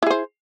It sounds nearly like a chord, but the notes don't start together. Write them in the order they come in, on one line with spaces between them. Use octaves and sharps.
E4 G#4 C5